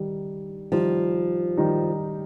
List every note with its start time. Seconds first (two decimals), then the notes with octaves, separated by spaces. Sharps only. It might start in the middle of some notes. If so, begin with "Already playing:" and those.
Already playing: D#3 G3 D#4
0.72 D#3 F3 G3 D#4
1.57 D#3 G3 D#4